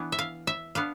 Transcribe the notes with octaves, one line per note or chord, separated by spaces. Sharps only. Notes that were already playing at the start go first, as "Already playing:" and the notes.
Already playing: E3 B3 D4
E5
F5
E5
B3 D4 F5